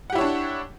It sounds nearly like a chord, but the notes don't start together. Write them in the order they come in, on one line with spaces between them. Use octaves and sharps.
F#5 G4 E4 C#5 D4